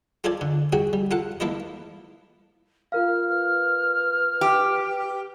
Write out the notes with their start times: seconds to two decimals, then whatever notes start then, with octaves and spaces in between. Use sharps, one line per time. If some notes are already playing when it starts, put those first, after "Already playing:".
0.24 F4 A4 C5 D5 G#5
0.41 D3
0.73 C2 F#4 G#4 G5
0.93 G3
1.11 F4 A4 F#5
1.40 A3 A#3 E4 C5 D#5
2.92 F4 A#4 F5 F6
3.29 B4 F6
4.41 G4